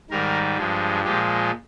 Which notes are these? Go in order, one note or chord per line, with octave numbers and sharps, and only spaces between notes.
G#2 D#3 G3 A#4
G2 F3 G#3
A#2 F3 G#3 G4